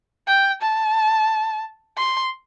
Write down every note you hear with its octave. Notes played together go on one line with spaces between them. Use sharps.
G5
A5
C6